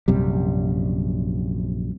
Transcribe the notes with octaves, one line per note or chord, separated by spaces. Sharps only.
A#1 F#2 C3 G3